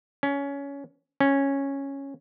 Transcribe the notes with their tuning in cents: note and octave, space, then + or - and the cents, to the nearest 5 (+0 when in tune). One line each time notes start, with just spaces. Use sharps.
C#4 +20
C#4 -5